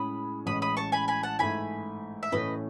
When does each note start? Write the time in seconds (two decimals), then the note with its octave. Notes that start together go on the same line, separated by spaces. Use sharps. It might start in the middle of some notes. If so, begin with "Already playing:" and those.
Already playing: A2 G#3 C#4 G#4 B5 D#6
0.46 A1 A2 E3 G#3 C#4 B5 D#6
0.62 B5 D#6
0.77 A5 C#6
0.92 G#5 B5
1.08 G#5 B5
1.23 F#5 A5
1.39 G#2 E3 A3 E4 G#5 B5
2.23 E5
2.32 A2 E3 A3 C#4 B4 D#5